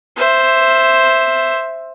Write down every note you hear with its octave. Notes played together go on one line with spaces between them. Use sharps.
C5 E5